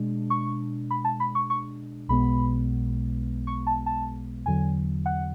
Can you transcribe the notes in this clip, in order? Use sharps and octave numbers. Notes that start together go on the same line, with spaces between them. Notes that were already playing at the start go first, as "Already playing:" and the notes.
Already playing: B2 G#3 D4
C#6
B5
A5
B5
C#6
C#6
B1 B2 G#3 B3 B5
C#6
A5
A5
E2 D3 F#3 G#5
F#5